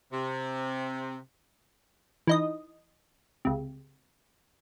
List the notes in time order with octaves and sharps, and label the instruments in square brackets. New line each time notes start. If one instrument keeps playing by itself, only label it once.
[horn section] C3
[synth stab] E3 D#4 D#5
C#2 C3